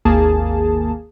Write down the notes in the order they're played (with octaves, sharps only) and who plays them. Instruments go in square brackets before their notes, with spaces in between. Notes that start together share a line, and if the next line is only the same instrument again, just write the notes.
[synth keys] G#1 D#2 A#3 G#4 A5